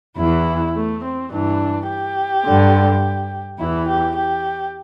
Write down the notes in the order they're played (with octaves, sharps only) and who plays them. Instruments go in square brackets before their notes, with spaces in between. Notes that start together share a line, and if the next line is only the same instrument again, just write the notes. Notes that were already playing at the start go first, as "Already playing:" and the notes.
[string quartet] E2 E3 E4
A3
C4
G2 E3 D4
G4
G2 D3
E2 E3 E4
G4
G4